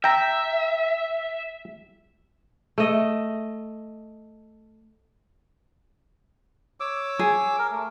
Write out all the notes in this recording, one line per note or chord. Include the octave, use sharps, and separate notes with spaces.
E5 G5 A#5
A3 A4 D#5
C#5 D6 E6
G#4
A#4
A3